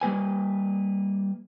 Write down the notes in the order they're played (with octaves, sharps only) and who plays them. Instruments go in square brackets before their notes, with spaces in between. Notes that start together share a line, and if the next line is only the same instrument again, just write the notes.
[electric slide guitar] G3 A#3 B4 G#5